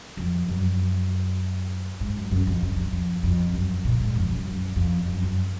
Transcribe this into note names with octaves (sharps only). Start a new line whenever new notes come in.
F2
F#2
G#2
F#2
F#2
F2
F#2
F2
F#2
F2
F2
F#2
A#2
G#2
F2
F#2
F#2
F2
F#2
F#2